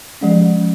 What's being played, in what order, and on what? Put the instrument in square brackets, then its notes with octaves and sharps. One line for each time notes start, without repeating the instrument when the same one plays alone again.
[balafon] F3 G#3 C#4